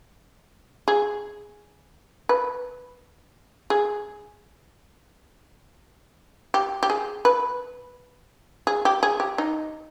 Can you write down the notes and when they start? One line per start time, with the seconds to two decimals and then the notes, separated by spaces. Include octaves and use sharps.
0.88 G#4
2.29 B4
3.70 G#4
6.54 G4
6.83 G4
6.90 G#4
7.25 B4
8.67 G#4
8.85 G4
9.03 G#4
9.20 G4
9.38 D#4